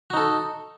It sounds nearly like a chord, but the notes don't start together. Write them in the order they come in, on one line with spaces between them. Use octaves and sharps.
F#4 D#4 A4